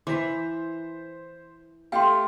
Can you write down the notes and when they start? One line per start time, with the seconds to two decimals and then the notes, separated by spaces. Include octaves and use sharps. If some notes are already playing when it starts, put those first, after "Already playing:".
0.07 E3 C5 D6 B6
1.92 A3 G4 F5 G5 C6